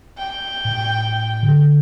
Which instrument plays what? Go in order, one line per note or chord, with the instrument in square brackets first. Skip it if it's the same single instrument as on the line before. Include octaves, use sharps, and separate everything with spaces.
[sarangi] G5
[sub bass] A2
D3